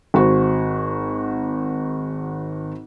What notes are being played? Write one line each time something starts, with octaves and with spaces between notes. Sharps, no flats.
G#1 F#4 C5